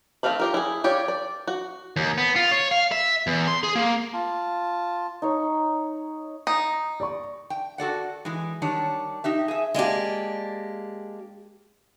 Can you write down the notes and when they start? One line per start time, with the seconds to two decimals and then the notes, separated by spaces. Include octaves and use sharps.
0.23 D#3 A3 C4 F5 B5
0.40 F4 G4 A#4
0.54 E4 G#4
0.84 F4 G4 C#5 D5
1.08 D5
1.48 F#4
1.96 D#2
2.18 B3
2.36 F4
2.51 C#5
2.71 F5
2.92 E5
3.27 E2
3.48 C6
3.63 G#4
3.76 A#3
4.13 F4 A5
5.22 D#4 C#5
6.47 D#4
7.00 D5 C#6
7.50 G5
7.78 F#4 A4 D5 F#5
8.25 E3 G#3
8.62 D#3 G3 D4 C#5
9.24 D#4 G4 E5
9.48 G#4 E5
9.74 G#3 A#3 D4 G4